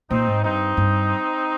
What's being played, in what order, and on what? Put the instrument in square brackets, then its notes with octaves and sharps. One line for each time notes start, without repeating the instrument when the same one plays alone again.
[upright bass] A#2 [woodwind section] C4 D#4
[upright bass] G#2
[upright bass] G2 [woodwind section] C4 D#4
[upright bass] G2